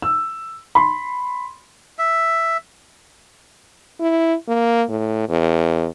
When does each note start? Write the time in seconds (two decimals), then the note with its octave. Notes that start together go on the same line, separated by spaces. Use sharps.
0.02 E6
0.75 B5 C6
1.99 E5
4.00 E4
4.48 A#3
4.89 A2
5.29 E2